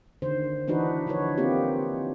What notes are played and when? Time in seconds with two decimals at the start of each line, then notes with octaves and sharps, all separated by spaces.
0.22 D3 D#3 C5
0.68 E3 D4 D#4 F#4 B4
1.07 D3 F3 D#4 F#4 B4 C#5
1.38 A#3 C4 D#4 F4 G4